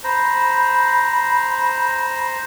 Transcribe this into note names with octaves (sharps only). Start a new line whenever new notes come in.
C5 A#5 B5